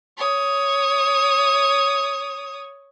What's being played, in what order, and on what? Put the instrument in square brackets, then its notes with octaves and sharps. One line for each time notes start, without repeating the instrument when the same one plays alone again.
[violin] C#5 D#6